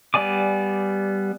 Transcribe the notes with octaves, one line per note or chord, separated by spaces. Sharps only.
G3 B3 D5 G#5 D6